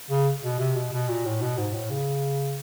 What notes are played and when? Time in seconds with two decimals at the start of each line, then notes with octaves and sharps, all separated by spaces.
0.10 C#3
0.43 B2
0.60 C3
0.76 B2
0.92 B2
1.08 A#2
1.26 A2
1.41 B2
1.57 G#2
1.74 A2
1.91 C#3